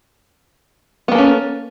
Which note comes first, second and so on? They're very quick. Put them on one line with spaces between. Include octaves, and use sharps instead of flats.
B3 A#3 A4 C#4